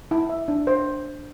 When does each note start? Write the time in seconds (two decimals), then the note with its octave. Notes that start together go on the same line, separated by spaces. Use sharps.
0.11 E4
0.29 E5
0.48 D4
0.67 C5